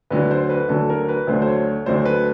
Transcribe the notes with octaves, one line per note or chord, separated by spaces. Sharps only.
D2 D3 F#3 B4
C5
B4
D2 D3 F#3 A4
A#4
B4
D2 D3 F#3 A3 C5
C5
C#5
D2 D3 F#3 A3 C5
B4